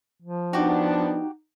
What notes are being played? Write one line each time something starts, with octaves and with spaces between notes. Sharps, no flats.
F3
B3 D4 D#4 F#4 G4